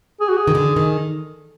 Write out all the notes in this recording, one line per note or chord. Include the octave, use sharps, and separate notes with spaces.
G#4
F#4
G#4
D#3
D3
D#3